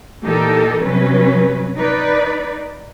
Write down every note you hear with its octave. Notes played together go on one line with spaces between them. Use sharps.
A#2 E3 D#4 G4 A4 A#4
G2 C3 F#3 G3 C#4 B4
D#4 B4 D5